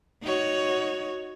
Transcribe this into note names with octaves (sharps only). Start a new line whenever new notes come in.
D#4 F#4 C#5